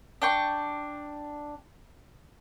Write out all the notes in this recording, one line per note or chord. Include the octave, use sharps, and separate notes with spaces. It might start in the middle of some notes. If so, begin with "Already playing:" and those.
D4 G5 C#6